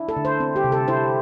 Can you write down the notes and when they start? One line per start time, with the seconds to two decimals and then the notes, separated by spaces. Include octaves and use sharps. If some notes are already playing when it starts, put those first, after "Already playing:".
Already playing: D4 E4
0.09 A4
0.17 D3
0.25 C5
0.40 C4
0.56 G4
0.64 C3
0.72 A4
0.88 E4 C5